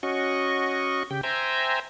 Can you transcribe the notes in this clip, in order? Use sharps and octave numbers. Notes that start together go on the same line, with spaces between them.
C#4 F#4 D#5 C#6
C#3 G4 G5
C5 E5 G5 G#5 A#5